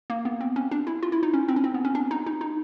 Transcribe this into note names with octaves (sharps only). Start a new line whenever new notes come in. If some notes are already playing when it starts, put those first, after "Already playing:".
A#3
B3
C4
C#4
D4
E4
F4
E4
D#4
C#4
C4
C#4
C4
B3
C#4
D4
D#4
D#4
D#4